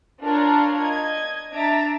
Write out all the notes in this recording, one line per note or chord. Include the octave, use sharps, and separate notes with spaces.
D4 F4 A#4 C#5 F5
D#5 G#6
D4 E5 A#5 A6 D7